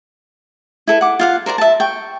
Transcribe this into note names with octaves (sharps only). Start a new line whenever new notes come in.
E4 A4 B4
F#5 D6
F4 F5 F#5
A#4 C5 D5 A#5
E5 A5
G5 C#6